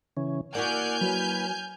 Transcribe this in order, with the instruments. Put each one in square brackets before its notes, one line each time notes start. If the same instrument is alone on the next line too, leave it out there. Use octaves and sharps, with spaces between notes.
[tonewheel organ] C#3 E3 C#4
[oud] A#3 E4 F#4 [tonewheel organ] D5 F#5 [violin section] G#5 F6 G6
[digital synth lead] F#3 [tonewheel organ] B4